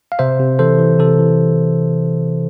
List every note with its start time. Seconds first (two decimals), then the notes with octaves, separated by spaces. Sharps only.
0.12 F5
0.19 C3 C5 E5
0.40 C3
0.59 E3 A4 C5
0.79 E3
0.99 C3 A4
1.19 E3